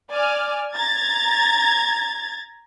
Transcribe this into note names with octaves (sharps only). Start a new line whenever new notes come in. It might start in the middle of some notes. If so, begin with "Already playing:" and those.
D5 G#5 F6
A#5 G#6 A6